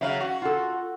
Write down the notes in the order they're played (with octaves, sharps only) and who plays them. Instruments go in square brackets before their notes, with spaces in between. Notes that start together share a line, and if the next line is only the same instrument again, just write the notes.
[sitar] C#3 F#3 [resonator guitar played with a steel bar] E5 F5
[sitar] F#4
[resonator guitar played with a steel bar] F4 A4